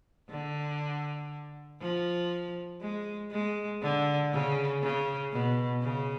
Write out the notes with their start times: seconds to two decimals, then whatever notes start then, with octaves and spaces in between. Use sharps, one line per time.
0.30 D3
1.81 F3
2.81 G#3
3.31 G#3
3.82 D3
4.32 C#3
4.82 C#3
5.32 B2
5.82 C#3